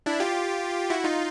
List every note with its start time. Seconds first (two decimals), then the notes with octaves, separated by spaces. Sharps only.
0.06 D4 E4
0.20 F4 G4
0.90 E4 F#4
1.04 D#4 F4